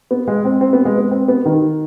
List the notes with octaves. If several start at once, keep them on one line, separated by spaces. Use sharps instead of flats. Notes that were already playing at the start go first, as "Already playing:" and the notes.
B3
G#3
C4
C4
B3
G#3
B3
C4
B3
D#3